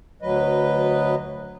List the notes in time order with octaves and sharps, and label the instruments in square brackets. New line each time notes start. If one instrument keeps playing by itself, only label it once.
[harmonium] D2 F#3 B4 D#5